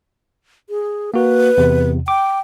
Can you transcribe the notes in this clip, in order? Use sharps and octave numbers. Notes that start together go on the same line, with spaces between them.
G#4
A#3 F#4 B4
E2 C3
G5 D6